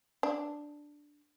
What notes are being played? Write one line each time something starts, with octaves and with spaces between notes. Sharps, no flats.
D4